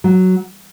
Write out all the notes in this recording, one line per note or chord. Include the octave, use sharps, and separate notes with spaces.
F#3